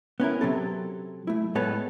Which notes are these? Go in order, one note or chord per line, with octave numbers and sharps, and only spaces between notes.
B3 C#4 E4 A#4
C3 F#3 C4 A4
A3 E4
A2 G#3 B3 A4 B4 C#5